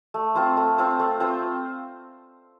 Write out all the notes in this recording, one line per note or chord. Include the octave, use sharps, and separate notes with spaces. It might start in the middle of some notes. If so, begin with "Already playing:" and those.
A3
C4 F4 C5
A3
C4 F4 C5
A3
C4 F4 C5